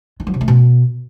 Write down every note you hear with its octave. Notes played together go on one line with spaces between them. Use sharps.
D#3
F#3
C3
A3
B2